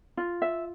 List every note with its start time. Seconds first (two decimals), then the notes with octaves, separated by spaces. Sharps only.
0.17 F4
0.42 E5